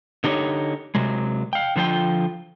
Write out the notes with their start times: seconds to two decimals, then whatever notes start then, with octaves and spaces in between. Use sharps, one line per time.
0.24 D3 D#4 G4 C5 C#5
0.95 C3 F#3 G#3
1.53 F5 G5
1.76 D3 F3 F4 C5 G5